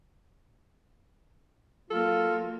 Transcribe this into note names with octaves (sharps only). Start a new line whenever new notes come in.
F#3 A#3 F4 A4